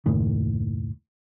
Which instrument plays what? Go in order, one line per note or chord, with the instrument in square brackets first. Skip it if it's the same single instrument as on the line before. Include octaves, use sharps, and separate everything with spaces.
[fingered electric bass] F#1 D#2 A2 D#3